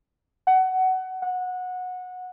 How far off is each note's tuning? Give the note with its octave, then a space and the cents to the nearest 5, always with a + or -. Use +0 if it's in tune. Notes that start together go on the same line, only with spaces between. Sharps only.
F#5 +20
F#5 -20